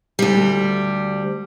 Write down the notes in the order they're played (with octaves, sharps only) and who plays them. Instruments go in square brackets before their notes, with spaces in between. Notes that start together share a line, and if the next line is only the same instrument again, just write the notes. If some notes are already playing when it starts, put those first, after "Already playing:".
[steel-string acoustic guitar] D2 G3